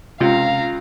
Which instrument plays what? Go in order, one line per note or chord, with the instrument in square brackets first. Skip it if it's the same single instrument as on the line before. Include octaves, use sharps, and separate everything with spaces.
[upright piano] C#2 [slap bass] C3 [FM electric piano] F4 [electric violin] F5 A#5